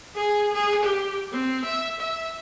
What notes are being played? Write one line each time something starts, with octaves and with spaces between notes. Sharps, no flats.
G#4
G#4
G4
C4
E5
E5